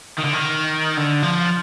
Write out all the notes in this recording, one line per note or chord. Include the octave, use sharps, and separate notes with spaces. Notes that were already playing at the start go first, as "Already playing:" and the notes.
D#3
D3
D#3
D3
F3